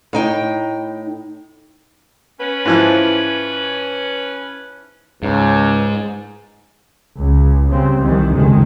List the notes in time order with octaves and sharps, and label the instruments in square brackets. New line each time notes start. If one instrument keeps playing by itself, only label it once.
[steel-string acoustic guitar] A2 D#4 G5
[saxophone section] C#4 B4
[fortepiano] G#2 E3 F3
[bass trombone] C#2 [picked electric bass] G#2
[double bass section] C#2
C#3 G3 C4
C2 D#3 E3 G3
F#1 D2 C3 D#3 G#3